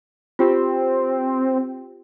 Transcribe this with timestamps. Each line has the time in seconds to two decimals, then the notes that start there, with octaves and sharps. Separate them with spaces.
0.39 C4 F4 G4